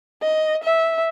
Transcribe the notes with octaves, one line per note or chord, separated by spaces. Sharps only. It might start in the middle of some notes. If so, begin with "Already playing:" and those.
D#5
E5